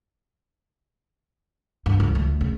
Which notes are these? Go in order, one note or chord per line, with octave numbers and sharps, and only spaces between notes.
G2
C#2
D2
C#3